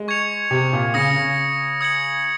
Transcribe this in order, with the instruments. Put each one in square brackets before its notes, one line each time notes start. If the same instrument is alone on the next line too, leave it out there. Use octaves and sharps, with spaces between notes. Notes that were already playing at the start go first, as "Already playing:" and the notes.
Already playing: [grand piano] G#3
[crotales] C#6 G#6 C#7 F7
[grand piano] C3
A#2
[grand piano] C#3 [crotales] D#6 A#6 C#7
[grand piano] C#3
[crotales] D#6 G#6 C#7 F#7